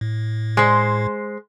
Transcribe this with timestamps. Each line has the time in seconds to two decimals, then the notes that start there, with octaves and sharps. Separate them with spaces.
0.01 A2
0.57 G#3 C5